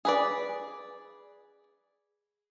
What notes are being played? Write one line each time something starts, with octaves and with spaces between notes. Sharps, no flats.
G#4 B4 D5